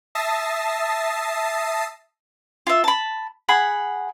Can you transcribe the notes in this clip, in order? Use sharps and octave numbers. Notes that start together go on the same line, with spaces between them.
E5 A5 D#6 A6 A#6 C7
F4 E5
A5 B5
G#4 F#5 B5